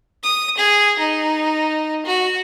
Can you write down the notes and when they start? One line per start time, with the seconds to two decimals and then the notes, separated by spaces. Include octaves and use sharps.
0.23 D#6
0.57 G#4
0.99 D#4
2.06 F#4